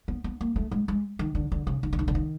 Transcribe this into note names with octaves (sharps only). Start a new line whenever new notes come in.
B3
B3
A#3
A3
G#3
G#3
D#3
D3
D3
C#3
D#3
D3
D#3
D3
D#3